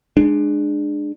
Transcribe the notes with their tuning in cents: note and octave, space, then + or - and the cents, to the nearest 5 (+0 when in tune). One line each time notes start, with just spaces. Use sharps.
G#3 +0 D4 +20